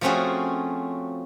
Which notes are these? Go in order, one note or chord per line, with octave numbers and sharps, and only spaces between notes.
F3 A3 C4 C#4 F#4 G#4